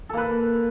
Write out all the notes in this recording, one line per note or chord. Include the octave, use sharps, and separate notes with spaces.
A#3 A4 B4